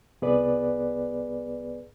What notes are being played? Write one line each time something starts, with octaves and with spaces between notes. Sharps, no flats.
C2 B3 G#4 B4 D5